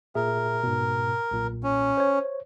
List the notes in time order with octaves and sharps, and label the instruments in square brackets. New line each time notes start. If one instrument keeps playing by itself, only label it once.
[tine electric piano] A#2 G#4 E5 [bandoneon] A#4
[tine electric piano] G#2 B2
B1 A#2
[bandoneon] C#4
[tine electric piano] C5 C#5